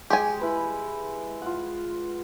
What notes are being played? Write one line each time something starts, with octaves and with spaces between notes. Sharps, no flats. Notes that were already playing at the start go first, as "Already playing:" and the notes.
G#3 G4 G#5
E4 B4 B5
F4 F#5